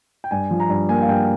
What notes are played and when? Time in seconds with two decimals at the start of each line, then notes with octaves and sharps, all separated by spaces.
0.24 G5
0.31 G2 G#5
0.51 F3
0.60 A#5
0.69 G2
0.89 A#3 G#5
0.96 G5
1.02 F5
1.08 G2 G5